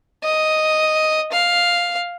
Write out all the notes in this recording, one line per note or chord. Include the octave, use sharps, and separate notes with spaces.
D#5
F5